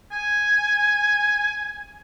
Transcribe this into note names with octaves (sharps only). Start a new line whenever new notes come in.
G#5